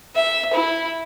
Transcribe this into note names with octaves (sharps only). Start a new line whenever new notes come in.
E5
E4